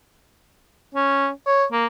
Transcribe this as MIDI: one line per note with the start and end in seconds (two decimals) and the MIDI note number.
0.95 1.29 61
1.47 1.65 73
1.72 1.86 58